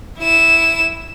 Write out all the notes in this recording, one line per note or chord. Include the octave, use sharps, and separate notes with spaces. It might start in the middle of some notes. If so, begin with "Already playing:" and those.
E4 E7